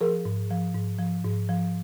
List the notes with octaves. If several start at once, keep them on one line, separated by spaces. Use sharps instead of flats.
F3 G#4 A#4
G#2
F3
G#2
F3
G#2
F3